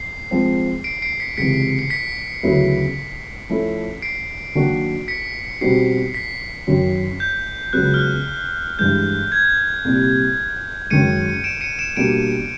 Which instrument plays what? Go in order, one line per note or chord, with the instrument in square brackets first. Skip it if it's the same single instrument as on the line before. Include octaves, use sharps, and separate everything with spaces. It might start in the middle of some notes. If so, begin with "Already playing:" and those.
Already playing: [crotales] C7
[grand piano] F3 G#3 C4
[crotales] C7 D7
C7 D7
B6 C#7
[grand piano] C#2 C3 E3 [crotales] B6 C#7
[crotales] C7
B6 C#7
[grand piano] D2 C#3 F#3 B3 E4
F3 A3 C#4 E4 A4
[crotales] C7 D7
[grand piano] D#3 F#3 A#3 D4 F#4
[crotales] B6 C#7
[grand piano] B2 G3 C4 D#4 F#4 [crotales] C7
[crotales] B6
[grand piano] F#2 D#3 F#3
[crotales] G6
[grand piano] C#2 C#3 F#3 B3 [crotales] F#6
[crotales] F6
F#6
[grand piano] G2 E3 G#3 [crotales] G6
[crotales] G#6
[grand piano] C2 A#2 G3
[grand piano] F#2 D#3 G#3 [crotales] C#7 D#7
[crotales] D7 E7
C#7 D#7
D7 E7
[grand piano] B2 G3 A#3 D4 [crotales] D7 E7